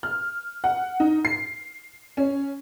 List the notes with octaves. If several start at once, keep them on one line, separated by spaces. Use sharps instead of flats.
F6
F#5
D#4
C7
C#4